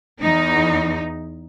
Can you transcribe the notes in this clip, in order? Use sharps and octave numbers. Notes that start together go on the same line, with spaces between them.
E2 D#4